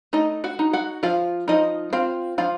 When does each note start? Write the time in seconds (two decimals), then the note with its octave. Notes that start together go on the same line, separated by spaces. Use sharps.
0.13 A3 D#4 D#5
0.44 F#4 F#5
0.59 D#4
0.73 F#4 F#5
1.03 F3 F4 F5
1.48 F3 D#4 D#5
1.93 C4 F4 F5
2.38 F3 F4 F5